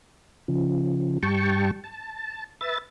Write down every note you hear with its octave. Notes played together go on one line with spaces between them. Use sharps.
C#3 F3
G2 G3 G5 A5 C#6
A5
B4 E5 A6